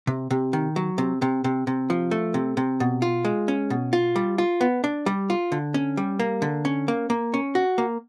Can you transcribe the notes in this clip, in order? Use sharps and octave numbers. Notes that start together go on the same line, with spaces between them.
C3
C3
D#3
F#3
C3
C3
C3
C3
F3
A3
C3
C3
B2
F4
G#3
C#4
B2
F4
G3
F4
B3
D4
G3
F4
D3
C#4
G3
A#3
D3
C#4
A#3
A#3
C#4
F#4
A#3